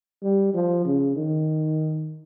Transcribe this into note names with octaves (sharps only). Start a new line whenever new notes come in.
G3
F3
C#3
D#3